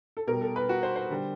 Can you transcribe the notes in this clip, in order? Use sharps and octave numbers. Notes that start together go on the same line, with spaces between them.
A4
B2 G3 A#4
A4
B4
F#4
C5
C5
D3 G3